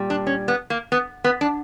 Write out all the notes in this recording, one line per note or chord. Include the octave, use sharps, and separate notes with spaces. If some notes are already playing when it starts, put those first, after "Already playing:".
Already playing: A#2 G3
D4
C#4
B3
A#3
B3
B3
D4